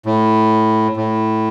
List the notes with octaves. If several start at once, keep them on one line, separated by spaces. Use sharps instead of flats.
A2
A2